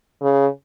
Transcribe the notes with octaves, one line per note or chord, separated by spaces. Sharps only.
C#3